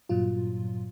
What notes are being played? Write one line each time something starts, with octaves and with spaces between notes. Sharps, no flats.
G2 A#2 F#3 F4